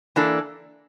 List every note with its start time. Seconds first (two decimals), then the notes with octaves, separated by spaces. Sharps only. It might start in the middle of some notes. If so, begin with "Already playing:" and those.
0.16 E3 A#3 D4 A4